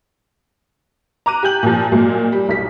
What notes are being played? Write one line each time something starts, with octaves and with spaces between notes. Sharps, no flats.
A#5 D6 F#6 D#7
G4 G#5 G6 F#7
A#2 F3
A#2 F#3 G#3 A#3
G3
B1 B6